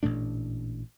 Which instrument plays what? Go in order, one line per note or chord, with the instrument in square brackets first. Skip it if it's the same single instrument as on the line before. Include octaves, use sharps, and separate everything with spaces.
[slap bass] A1 A#2 A3 D4